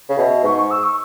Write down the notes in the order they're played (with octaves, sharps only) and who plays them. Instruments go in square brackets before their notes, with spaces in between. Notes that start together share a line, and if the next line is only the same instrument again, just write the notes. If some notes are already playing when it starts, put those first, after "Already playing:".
[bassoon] C#3
[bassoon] B2 [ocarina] E5
[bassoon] G#2 [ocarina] C#6
[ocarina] C#6
E6
C#6